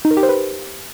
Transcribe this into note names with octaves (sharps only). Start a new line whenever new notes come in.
D#4
A#4
G4
C5
B4